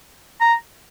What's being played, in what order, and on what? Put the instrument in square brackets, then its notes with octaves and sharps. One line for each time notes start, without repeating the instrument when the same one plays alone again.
[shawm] A#5